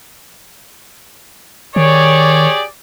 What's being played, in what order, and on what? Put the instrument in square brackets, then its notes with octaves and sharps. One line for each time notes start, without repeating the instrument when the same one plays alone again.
[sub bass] D#3 [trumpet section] G4 G#4 D5 [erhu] C#5